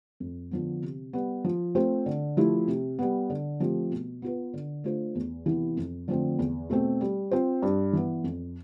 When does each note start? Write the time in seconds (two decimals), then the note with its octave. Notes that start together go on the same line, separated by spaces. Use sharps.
0.20 F2
0.51 D3 F3 B3
0.82 C3
1.13 G3 B3
1.44 F3
1.75 A3 C4 F4 C5
2.06 D3
2.37 F3 A3 E4 G4
2.68 C3
2.99 G3 B3
3.30 D3
3.60 F3 A3 C4 G4
3.91 B2
4.22 B3 F4 B4
4.54 D3
4.84 A3 D4 F4 C5
5.15 E2
5.46 C3 E3 B3 E4
5.77 F2
6.08 D3 F3 A3 C4
6.39 E2
6.70 B2 A3 C4
7.01 G3
7.31 C4 F4 C5
7.62 G2
7.93 E3 B3
8.24 F2